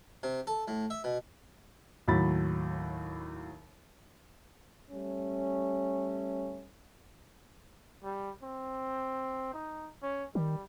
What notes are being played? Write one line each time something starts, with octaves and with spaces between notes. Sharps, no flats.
C3
A4
A2
E5
B2
D#2 A2 F#3 B5 A6
G3 A3 C#4
G3
C4
D#4
C#4
D#3 G3